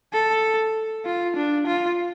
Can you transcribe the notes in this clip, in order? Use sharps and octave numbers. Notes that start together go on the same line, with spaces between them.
A4
F4
D4
F4